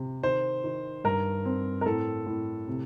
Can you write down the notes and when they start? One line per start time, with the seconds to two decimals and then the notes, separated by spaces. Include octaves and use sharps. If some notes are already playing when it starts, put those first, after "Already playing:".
Already playing: C3
0.23 D#3 C5
0.64 D#3
1.04 G2 A#4
1.45 C4
1.81 A#4
1.86 A2 A4
2.26 A2
2.67 C3